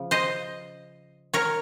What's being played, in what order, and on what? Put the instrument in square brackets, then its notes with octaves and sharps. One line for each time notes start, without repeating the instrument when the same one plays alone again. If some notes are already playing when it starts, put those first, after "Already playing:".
Already playing: [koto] C#3 F3
C5 D#5
A#4 C#5